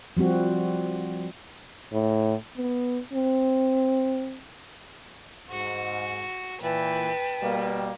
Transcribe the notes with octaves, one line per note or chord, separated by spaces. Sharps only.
F3 G3 C4 F#4
A2
B3
C4
G#2 F#4
A#2 E3 B4 G5 A5
B2 G3 A#3